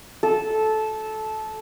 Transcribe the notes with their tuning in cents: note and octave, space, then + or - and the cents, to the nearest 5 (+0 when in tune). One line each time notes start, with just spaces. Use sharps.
A4 -15